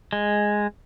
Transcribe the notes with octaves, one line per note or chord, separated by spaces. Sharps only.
G#3